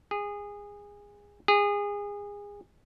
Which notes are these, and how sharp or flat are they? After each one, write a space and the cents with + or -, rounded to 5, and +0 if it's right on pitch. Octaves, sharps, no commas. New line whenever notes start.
G#4 -20
G#4 -25